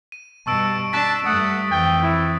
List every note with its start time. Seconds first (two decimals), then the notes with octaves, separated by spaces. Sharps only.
0.12 D#7
0.47 G2 B2 A5 C#6 E6 D7
0.93 D4 A5 F#6 A6 B6
1.26 G2 A3 F#5 D#6
1.71 F2 E3 G5
2.02 E4